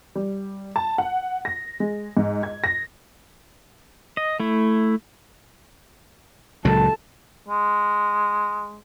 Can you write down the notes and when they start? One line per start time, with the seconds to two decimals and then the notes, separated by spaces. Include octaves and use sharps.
0.16 G3
0.76 A5
0.98 F#5
1.45 A#6
1.80 G#3
2.17 G#2
2.43 G#6
2.64 A#6
4.17 D#5
4.40 A3 E4
6.65 C#2 A#2 F#3 A4 A5
7.48 G#3